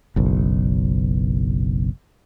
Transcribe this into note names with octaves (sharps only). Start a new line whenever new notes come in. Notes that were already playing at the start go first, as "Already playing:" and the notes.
F#1 B1